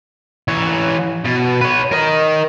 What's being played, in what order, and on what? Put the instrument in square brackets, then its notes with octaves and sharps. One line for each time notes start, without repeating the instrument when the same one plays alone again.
[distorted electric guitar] E3 C#5
B2
B4 C#5
A#4 D#5